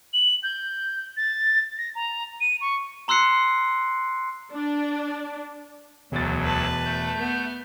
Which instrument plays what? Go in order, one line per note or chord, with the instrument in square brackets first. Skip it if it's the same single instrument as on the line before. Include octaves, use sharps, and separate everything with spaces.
[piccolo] F#7
G6
A6
A#6
A#5
D#7
C#6
[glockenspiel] A#5 C6 E6 F#6 C7 C#7
[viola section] D4
[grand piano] E1 A6 [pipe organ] D2 F#3
[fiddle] B4 A5
[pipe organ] A3 G6
[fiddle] B3